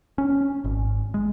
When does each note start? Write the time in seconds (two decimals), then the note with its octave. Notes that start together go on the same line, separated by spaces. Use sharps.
0.18 C#4
0.64 G#1
1.14 G#3